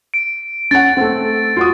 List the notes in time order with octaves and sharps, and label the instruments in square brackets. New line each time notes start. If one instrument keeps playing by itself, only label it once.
[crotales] D7
[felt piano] C#4 F#5 [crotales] A6
[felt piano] A3 C4
F4 F#4 D#6